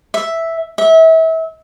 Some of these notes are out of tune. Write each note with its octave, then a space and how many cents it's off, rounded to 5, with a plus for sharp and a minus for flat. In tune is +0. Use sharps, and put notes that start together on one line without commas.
E5 +0
E5 -30